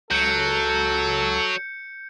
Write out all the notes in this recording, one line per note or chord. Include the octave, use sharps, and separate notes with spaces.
C#2 F#3 A4 G6 C#7